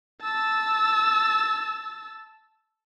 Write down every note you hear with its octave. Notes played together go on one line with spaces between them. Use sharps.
A5 E6